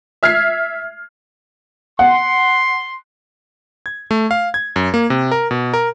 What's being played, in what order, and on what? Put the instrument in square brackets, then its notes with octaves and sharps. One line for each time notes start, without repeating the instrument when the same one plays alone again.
[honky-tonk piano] E5 F6 G#6 C7
[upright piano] F#5 [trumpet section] C6
[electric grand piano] G#6
A3
F5
G#6
F#2
A#3
C3
A#4
B2
A#4